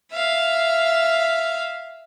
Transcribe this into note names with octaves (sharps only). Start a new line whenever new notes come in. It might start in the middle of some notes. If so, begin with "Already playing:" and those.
E5 F5